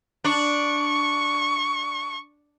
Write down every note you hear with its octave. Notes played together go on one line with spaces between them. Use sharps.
D4 C#6